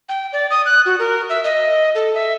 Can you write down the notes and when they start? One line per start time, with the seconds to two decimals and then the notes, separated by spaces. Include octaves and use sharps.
0.09 G5
0.33 D5
0.50 D#6
0.66 F#6
0.86 F#4
0.99 A#4
1.30 E5
1.44 D#5
1.95 A4
2.15 E5